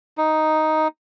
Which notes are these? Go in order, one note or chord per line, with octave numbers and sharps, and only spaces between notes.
D#4